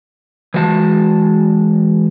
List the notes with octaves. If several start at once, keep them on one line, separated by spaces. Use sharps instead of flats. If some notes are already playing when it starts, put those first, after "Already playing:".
E3 G#3 F#4 F5 A5